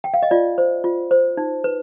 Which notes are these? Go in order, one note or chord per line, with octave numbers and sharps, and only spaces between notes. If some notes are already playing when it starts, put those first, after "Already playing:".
G5
F5
D#5
F4 D5
C5
F4
C5
D#4
B4